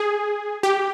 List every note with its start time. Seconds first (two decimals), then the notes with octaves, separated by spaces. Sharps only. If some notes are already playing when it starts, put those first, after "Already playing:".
Already playing: G#4
0.63 G4